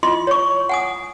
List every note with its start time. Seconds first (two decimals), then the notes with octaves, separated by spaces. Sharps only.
0.03 E4 F4 D#5 C6
0.27 C#5 C#6
0.69 F#5 G#5 D#6